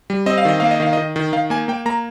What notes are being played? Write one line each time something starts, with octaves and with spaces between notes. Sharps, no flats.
G3
C4 D#5
F5
D#3 D#5
A#3 F5
D#5
D#3 F5
D#3 D#5
D#3
D#3 F5
A#3 G#5
A#3 G5
A#3 A#5